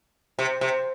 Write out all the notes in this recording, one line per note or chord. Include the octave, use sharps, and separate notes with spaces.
C3
C3